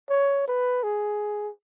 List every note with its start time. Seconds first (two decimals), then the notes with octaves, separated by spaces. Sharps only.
0.10 C#5
0.48 B4
0.84 G#4